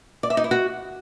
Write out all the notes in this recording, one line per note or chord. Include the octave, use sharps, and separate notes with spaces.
D5
E5
D#4
E4
F#4